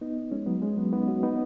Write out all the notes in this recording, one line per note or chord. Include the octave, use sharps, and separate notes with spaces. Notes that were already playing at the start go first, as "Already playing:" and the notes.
B3 D#4
G#3 C#4
F#3 B3
G#3 C#4
F#3 B3
B3 D#4
C#4 F#4
B3 D#4